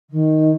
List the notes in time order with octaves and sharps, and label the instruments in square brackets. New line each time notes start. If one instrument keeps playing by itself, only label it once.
[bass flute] D#3